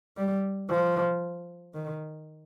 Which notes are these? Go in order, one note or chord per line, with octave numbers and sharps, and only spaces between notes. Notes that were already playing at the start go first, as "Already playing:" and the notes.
G3
F3
D#3